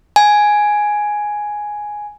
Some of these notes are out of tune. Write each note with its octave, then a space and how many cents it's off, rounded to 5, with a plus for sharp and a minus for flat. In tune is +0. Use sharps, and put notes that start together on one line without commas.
G#5 +5